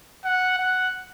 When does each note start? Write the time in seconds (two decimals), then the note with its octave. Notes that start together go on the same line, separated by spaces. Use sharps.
0.25 F#5
0.58 F#5